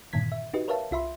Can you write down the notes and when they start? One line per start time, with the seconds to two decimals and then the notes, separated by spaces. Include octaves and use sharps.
0.13 G2 A#2 D3 D#3 G#6 B6
0.32 E5
0.54 D#4 F#4 G4 B4 D#5
0.68 A#4 B4 C#5 E5 F5 A5
0.91 C2 F4 E5 B5 C6